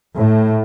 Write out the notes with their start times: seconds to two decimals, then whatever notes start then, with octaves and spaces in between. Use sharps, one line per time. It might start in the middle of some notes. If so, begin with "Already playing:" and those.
0.15 A2